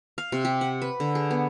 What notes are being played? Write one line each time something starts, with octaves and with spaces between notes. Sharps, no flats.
F5
C3
G4
F#5
B4
D3
G#4
B3